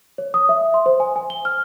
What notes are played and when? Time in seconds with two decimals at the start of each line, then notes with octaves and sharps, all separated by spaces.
0.18 C#5
0.34 D#6
0.49 E5
0.74 C6
0.86 C5
1.00 G#5
1.16 G#5
1.30 G7
1.45 F6